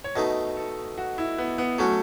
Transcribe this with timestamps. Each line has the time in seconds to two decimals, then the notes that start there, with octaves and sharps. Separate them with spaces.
0.04 C#5
0.15 B2 A3 D#4 D#5
0.57 A4
0.98 F#4
1.18 E4
1.38 B3
1.58 B3
1.79 F#3 A3 C#4 F#4